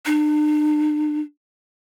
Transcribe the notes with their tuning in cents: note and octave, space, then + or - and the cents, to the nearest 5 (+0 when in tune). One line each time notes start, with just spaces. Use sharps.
D4 +45